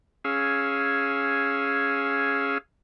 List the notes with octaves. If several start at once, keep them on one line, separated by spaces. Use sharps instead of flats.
C#4 G#4 F5 E6